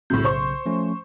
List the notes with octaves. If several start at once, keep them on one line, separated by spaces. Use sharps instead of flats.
B1 F#2 A2 C#3 G6
C5 C6 C#6
F3 A3 C#4